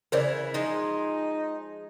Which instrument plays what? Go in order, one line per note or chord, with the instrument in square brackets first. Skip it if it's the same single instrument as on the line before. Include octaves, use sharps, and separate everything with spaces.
[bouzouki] C#3 E3 E4 [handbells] A#4 C5 D5
[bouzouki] F3 G#3 [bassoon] D#4